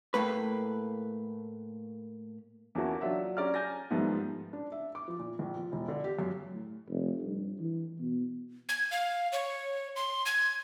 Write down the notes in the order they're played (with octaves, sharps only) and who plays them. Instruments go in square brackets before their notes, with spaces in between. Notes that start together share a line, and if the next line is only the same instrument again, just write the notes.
[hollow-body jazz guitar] A2 A3 A#3 B4
[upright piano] E2 A#3 C#4 E4 F#4 A5
F#3 D4 F4 E5 F#5
C#4 G4 D5 A#5 F6
G#5 G6 A6 A#6
G#2 D#3 F3 G3 A3 B3
[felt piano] D4
E5
D6
F3
A#2
A#1
F3
E1
D3
G4
F#2
[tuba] A2
F1
G2
E3
B2
[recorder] G#6
F5
C#5
C6
G#6